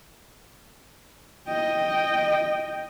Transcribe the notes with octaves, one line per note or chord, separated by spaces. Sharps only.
D#5 G5